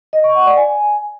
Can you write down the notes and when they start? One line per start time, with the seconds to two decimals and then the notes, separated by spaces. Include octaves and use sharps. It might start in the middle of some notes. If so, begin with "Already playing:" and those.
0.13 D#5
0.24 C#6
0.35 F#5
0.46 D5
0.57 G#5